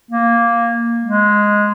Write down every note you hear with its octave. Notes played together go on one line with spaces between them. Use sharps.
A#3
G#3